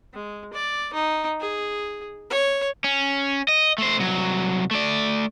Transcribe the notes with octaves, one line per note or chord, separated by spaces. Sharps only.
G#3
D5
D#4
G#4
C#5
C#4
D#5
A3 C5
C2 F#3
A3 D5